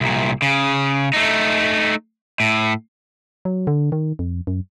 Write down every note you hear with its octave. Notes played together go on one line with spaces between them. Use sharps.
C2 A#2
C#3
A3 D#4
A2
F#3
D3
D#3
F2
F#2